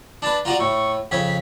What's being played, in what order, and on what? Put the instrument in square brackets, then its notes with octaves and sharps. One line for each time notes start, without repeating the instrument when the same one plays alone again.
[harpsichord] D4 B4 [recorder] A5
[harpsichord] F4 F#4 D5 [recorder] A#5
[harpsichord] A2 [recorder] C#6
[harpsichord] F2 C#3 C#5 [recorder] B6